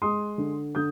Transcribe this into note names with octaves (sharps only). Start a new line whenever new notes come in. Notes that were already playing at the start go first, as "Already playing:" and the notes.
G#3 C6 D#6
D3
D3 D#6 G6